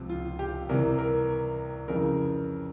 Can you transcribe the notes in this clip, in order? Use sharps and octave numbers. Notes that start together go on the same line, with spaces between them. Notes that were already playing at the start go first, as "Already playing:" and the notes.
Already playing: C#2 C3 F3
F4
G4
C2 C3 E3 A#4
A#4
F2 C#3 E3 A#4